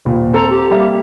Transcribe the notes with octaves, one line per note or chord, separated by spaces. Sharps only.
D#1 A#2
C4 A4 A#5
G4
G3 A#3 E5